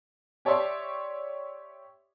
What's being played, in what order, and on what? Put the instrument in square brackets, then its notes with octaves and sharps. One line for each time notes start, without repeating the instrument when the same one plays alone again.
[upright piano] G4 C#5 D5 E5 C6